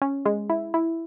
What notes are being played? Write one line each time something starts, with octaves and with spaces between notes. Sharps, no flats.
C#4
G#3
E4
E4